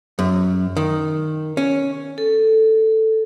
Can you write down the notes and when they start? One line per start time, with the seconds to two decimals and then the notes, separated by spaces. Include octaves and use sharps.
0.19 F#2
0.77 D#3
1.57 C#4
2.18 A4